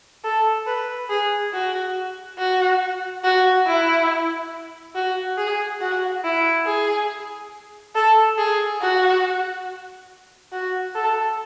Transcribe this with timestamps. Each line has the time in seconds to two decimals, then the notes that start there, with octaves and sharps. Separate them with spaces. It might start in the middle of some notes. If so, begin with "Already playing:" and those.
0.24 A4
0.67 B4
1.09 G#4
1.52 F#4
2.38 F#4
3.24 F#4
3.67 E4
4.95 F#4
5.37 G#4
5.81 F#4
6.24 E4
6.66 G#4
7.95 A4
8.38 G#4
8.81 F#4
10.52 F#4
10.95 A4